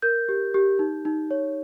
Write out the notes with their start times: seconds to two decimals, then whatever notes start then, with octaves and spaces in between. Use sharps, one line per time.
0.02 A#4 G6
0.29 G4
0.54 G4
0.79 D#4
1.05 D#4
1.31 C#5